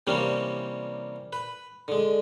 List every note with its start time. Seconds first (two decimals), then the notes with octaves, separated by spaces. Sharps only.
0.07 C3 E3 G3 A#3 C#4 D4
1.33 B4
1.88 D3 G#3